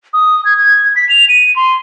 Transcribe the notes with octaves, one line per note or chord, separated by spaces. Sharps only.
D#6
G#6
G#6
B6
F7
D#7
C6